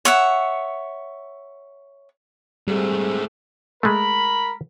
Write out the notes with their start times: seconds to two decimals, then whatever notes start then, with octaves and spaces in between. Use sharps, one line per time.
0.05 C#5 E5 F#5
2.67 G#2 G3 A3 C4 G#4
3.83 G#3 A3 A#4 B5